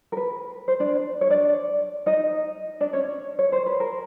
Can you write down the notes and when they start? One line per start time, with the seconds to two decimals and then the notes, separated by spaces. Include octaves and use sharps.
0.12 A#4
0.17 B4
0.68 C5
0.80 D4 D5
1.21 C#5
1.30 D4 D5
2.06 D#4 D#5
2.80 D4 D5
2.93 C#4 C#5
3.39 C#5
3.52 C5
3.66 B4
3.80 A#4